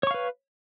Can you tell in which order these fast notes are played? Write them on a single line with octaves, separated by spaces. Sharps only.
C#5 C#6 F5 B4